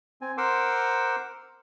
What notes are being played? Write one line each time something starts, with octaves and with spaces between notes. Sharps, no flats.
C4 G#5
A#4 C5 F#5 C6 D6 E6